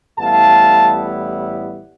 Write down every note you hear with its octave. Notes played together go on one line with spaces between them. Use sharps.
A1 A2 G3 B3 E4 F5 A5